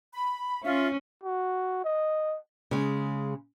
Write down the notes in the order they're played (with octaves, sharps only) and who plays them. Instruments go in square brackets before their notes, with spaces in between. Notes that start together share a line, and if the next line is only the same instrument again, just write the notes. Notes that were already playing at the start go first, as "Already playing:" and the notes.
[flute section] B5
[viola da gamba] C#4 [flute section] F4 E5
[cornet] F#4
D#5
[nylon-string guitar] C#3 G#3